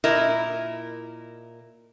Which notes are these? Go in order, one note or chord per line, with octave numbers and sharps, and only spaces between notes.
A#2 E4 A#4 D#5